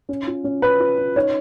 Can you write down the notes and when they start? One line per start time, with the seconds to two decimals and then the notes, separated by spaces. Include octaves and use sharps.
0.09 C#4
0.27 F4
0.44 C#4
0.62 C#4 B4
0.80 F4
0.98 C#4
1.16 D#4 C#5